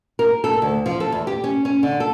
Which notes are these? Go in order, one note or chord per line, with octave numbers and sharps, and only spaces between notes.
A#4
A4
D2
F3
A4
E2
G4
C#4
C#4
D3
A4